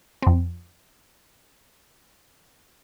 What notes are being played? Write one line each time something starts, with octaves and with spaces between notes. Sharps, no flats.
F2 C4